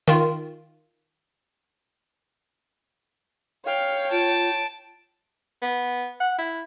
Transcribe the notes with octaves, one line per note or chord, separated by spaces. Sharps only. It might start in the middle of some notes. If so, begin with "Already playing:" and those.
D#3 F4
C#5 F5 G5
F4 A5 D7
B3
F#5
E4